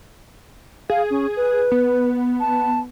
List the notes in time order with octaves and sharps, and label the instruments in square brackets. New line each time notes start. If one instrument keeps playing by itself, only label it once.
[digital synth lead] G#4 [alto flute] F5
[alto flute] C#4
B4
[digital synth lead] B3
[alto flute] A5